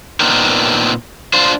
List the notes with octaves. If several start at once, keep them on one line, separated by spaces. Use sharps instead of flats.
A#2 B3 C4 D4 D#4 A#4
D4 F4 C5